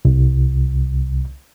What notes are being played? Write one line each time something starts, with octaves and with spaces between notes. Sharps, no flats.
C2